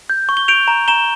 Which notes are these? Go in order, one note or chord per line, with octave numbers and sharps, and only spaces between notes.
G6
C#6
G7
G6 D7 F7
A#5
A#5 E7 G7